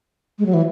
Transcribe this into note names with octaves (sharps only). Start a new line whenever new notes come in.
G#3
F#3
E3